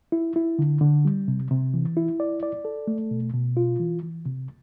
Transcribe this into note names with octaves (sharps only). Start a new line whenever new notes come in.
E4
E4
D3
D3
G3
C3
C3
E3
E4
D5
D5
A4
A3
B2
B2
F4
E3
E3
C3